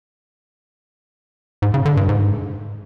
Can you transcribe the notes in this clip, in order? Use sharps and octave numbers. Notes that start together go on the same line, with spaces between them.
G#2
C#3
D3
G2
G#2